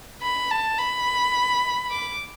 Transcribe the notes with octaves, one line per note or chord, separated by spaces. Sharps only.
B5
A5
B5
D6